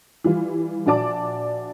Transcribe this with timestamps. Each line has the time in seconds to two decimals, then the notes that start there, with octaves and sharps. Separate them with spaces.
0.24 E3 G3 F4
0.86 A#1 D4 F#4 D5 A5 D6